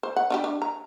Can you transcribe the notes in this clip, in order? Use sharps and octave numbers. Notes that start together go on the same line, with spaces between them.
C5
F#5
D4 F4 G4
D4
A#5